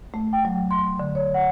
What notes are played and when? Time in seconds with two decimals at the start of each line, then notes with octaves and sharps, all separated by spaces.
0.14 A3
0.33 G5
0.45 F#3
0.71 C6
1.00 D3
1.15 C#5
1.34 F#5